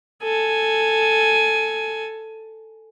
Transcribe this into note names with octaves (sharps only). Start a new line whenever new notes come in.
A4 G#5